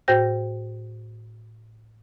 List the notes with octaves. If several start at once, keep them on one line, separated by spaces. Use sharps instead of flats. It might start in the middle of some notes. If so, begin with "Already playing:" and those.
A2 F#4 C5 G5 G6 A#6